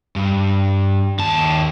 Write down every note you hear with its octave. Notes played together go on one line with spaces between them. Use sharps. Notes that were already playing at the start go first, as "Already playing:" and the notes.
G2
D#2 A5